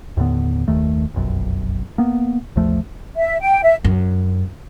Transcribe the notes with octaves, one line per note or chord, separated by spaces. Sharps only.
D#2 A2 D3 B3
F#1 D#2 D#3 A3
F1 B1 F#2
A#3 B3
A#1 E2 F3 A3
E5
G5
E5
F#2